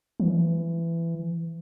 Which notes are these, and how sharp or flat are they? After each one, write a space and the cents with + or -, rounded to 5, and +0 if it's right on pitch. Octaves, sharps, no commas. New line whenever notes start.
E3 +20